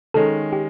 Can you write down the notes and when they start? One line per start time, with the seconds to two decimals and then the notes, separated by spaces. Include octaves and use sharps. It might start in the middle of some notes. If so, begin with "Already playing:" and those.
0.14 D#3 G#3 C#4 A4
0.53 G4